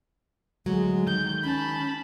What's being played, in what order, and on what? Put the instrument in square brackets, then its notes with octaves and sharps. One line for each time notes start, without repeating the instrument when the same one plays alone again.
[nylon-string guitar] D2 F#3 [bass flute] G#3
[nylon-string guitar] D#3 [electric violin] G6
[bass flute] C#4 [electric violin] A5 B5